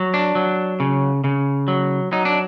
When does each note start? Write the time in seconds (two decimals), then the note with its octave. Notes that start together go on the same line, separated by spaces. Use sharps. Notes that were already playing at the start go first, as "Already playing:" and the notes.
Already playing: F#3
0.14 D4
0.35 F#3
0.80 C#3
1.24 C#3
1.68 F#3
2.12 F#3 D#4
2.25 D4